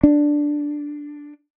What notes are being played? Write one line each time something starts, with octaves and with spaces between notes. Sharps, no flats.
D4